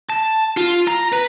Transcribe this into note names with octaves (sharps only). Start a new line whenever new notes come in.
A5
F4
A#5
B4